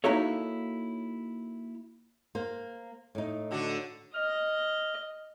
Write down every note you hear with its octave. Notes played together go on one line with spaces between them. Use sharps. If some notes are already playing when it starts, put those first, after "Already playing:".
A#3 D#4 E4 F#4 A4 C#5
A#3 C5
A2 D#4
D3 D4 F#4
D#5 F6